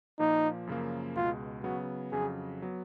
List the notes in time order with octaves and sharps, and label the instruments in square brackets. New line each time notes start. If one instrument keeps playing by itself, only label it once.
[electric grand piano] A#2 F3 A#3 [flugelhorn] D#4
[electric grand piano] F#2 C#3 F3 A#3
[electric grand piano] C#2 B2 G#3 [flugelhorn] F4
[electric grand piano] C#3 F#3 B3 [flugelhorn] F#4
[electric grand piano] F2 C#3 F#3 [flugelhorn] G#4
[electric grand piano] F#3 B3